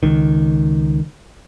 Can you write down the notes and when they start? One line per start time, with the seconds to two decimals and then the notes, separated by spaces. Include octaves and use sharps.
0.03 C#2 D#3